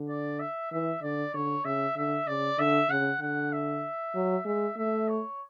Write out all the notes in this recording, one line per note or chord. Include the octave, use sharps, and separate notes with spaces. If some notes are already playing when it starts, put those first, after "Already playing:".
Already playing: D3
D5
E5
E3 E5
D3 D5
D3 C#5
C#3 E5
D3 E5
C#3 D5
D3 E5
C#3 F#5
D3 F#5
E5
F#3
G#3 E5
A3 E5
C#5